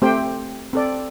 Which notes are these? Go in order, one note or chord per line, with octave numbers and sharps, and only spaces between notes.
A3 C4 G4 C5 G5
C4 A4 D5